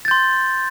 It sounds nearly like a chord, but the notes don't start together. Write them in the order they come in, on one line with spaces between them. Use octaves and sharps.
A6 G6 C6